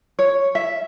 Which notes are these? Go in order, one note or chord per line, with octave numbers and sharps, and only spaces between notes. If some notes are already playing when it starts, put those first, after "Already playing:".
C#5
E5